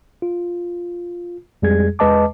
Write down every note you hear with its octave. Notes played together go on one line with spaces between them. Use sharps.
F4
F2 G3 G#3 G#4 G#6
E2 G#3 B4 D#5 A5 D6